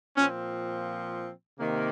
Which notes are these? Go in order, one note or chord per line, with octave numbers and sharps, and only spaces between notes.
A#2 F3 C4 C#4
C3 D#3 A#3